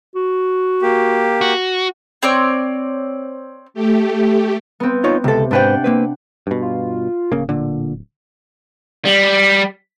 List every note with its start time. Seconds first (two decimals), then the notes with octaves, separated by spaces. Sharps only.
0.16 F#4
0.82 A#3 G4
1.41 F#4
2.23 C4 C#5 D5
3.74 A3 G4
4.80 B3 C4
5.04 D#4 F4 C#5
5.24 C#2 C3 A4
5.51 G#2 D4 B4 C5 F#5 G5
5.84 A#3 C4 B4
6.47 G2 B2
6.62 F4
7.32 D1 C#3 A#3
7.49 A#2 D3
9.05 G3